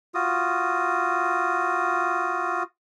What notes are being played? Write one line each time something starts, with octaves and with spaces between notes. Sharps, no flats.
F4 F#4 D#6